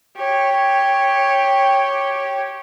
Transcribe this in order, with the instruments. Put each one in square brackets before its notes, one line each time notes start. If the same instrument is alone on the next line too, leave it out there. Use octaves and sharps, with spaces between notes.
[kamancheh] G4 C#5